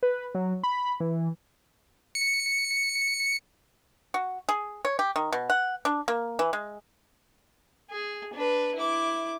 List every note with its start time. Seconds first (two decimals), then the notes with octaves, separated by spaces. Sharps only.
0.03 B4
0.35 F#3
0.64 B5
1.00 E3
2.15 C#7
4.14 F#4
4.49 G#4
4.85 C#5
4.99 G4
5.16 D#3
5.32 B2
5.50 F#5
5.85 D4
6.08 A#3
6.39 E3
6.53 G#3
7.90 G#4
8.34 D4 B4
8.75 E4 D6